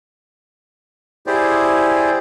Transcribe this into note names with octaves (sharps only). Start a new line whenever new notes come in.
E4 G4 G#4 C5 D5